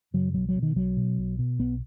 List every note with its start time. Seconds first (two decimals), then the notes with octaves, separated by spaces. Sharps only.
0.14 F#2 C#3 F#3
0.34 B1 F#3
0.49 F#3
0.56 B2
0.63 D#3
0.76 B1 F#3
0.97 B2
1.18 B1
1.39 B2
1.59 B1 B3